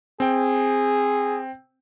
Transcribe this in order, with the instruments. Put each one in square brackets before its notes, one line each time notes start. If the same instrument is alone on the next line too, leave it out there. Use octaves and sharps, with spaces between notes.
[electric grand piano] C4 G5 [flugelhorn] G#4